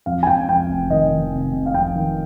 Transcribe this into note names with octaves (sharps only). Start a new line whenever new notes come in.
F2 F5
G#5
F2 G5
F2 G5
F1
D#3 D#5
D#3
C3
C3
F5
F2 G5
D#3